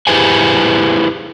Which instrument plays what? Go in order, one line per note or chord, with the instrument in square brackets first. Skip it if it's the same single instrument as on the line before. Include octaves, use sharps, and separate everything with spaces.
[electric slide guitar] E4 G4 G#4 B4 C5 G#5